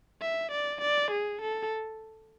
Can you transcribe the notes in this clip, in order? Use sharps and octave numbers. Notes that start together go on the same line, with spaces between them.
E5
D5
D5
G#4
A4